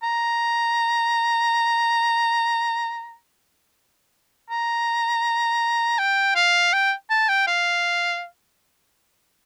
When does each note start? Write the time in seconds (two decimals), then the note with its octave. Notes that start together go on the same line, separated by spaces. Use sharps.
0.03 A#5
4.50 A#5
5.99 G5
6.35 F5
6.73 G5
7.10 A5
7.29 G5
7.47 F5